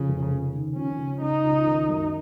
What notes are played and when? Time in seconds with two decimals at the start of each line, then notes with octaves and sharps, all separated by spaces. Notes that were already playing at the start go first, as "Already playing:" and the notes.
Already playing: F2 C#3
0.08 F1
0.31 C#3
0.53 D#2
0.76 F3 C#4
0.98 C#3
1.21 C#3 D#4
1.44 C#2
1.66 D#3
1.89 F#2